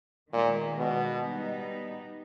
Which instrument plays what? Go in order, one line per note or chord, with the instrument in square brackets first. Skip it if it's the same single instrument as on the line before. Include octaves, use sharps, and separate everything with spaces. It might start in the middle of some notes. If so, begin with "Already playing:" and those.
[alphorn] A#2 [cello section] D#3 G#3 B3
[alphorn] B2
[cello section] G3 B3 D#4